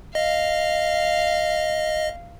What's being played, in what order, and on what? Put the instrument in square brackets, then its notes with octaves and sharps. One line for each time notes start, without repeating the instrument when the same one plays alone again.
[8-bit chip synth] D#5 [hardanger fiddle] F5